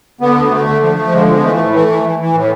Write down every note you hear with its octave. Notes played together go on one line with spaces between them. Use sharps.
D3 B3
D2
D3 A3
D3
F3 A3
F3
D3 G#3
F3
B3
E3 A3
A2
E3 A3
E3
E3
E3
A2